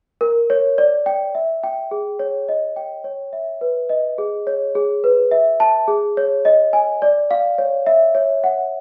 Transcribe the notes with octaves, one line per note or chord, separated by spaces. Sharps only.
A#4
C#5
D5
G5
E5
G5
G#4
C#5
D#5
G5
C#5
E5
B4
D#5
G#4
C#5
G#4
B4
E5
A5
G#4
C#5
D#5
G#5
D5
F5
C#5
E5
C#5
F#5